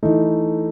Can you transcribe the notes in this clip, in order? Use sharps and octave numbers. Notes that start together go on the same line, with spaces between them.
E3 A3 D#4